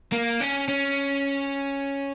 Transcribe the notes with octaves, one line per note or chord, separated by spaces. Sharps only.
A#3
C#4
C#4